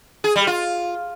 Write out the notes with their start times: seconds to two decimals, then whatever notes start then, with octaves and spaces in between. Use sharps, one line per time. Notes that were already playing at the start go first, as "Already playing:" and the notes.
0.24 G#4
0.36 G3
0.47 F4